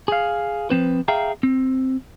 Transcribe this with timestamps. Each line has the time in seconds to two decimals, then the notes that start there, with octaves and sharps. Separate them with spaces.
0.08 G#4 F5
0.70 F3 C4 B4
1.08 G#4 E5 F5 G5 A#5
1.43 C4